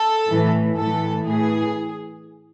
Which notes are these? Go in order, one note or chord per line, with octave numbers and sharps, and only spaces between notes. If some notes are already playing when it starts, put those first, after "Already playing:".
Already playing: A4
A2 E3
A2 E3 A4
A2 E3 G#4